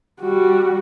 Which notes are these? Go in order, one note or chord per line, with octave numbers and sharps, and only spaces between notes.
G3 F#4